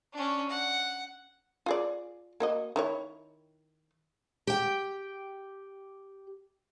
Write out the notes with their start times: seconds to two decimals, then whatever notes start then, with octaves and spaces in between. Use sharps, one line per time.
0.13 C#4 D4
0.49 F#5
1.66 F4 G#4 D5
2.40 A#3 F#4 D#5
2.76 D#3 E4 C#5
4.47 G4 G5